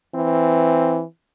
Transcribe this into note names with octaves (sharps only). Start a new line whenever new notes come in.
E3 C4